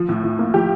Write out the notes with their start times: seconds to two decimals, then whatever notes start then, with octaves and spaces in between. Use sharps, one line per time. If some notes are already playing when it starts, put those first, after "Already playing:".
Already playing: F3
0.09 A2
0.24 A2
0.39 A#3
0.54 F3 G4